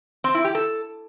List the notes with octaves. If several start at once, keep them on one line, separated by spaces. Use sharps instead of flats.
C4
E4
G4
A4